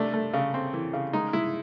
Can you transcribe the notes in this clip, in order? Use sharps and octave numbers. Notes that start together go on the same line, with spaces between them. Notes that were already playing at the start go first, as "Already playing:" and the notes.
Already playing: C3 A3 D4
A3
C#3
C4
E3
C#3
G#3 D#4
G#3 E4